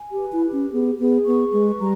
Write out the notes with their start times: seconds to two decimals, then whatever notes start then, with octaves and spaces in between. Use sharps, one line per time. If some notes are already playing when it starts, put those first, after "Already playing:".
Already playing: G#5
0.12 G4
0.19 B4
0.32 E4
0.46 G4
0.52 C#4
0.72 B3 G#4
0.99 B3 G#4
1.26 B3 C#6
1.53 G#3 B4
1.80 G3 A#5